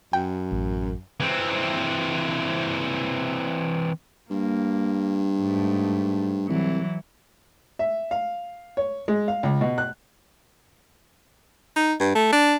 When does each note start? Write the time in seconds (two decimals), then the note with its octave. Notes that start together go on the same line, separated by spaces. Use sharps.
0.13 F#2 G5
0.51 A1
1.20 E3 C4
4.30 G2 A#3
5.39 G#2 A3
6.49 C2 E3 F#3
7.79 E5
8.11 F5
8.77 C#5
9.08 G#3
9.28 F5
9.43 C#2
9.61 B2
9.78 F#6
11.76 D#4
12.00 G2
12.15 A3
12.32 D4